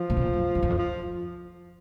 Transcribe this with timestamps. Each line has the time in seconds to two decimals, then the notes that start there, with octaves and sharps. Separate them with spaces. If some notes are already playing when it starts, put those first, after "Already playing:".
Already playing: F3
0.10 A#2
0.17 B2
0.21 A#2
0.33 F#2
0.55 F2
0.63 E2
0.70 F2
0.78 F3